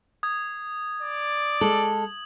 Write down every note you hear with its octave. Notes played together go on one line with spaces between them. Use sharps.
D#6 G#6
D5
G#3 A4 F#7